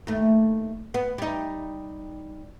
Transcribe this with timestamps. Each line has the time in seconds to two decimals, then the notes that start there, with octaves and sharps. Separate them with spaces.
0.07 D#2 A3
0.94 B3
1.18 G3 D#4